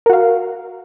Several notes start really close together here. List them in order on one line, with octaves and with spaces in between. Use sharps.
A#4 F#4 F5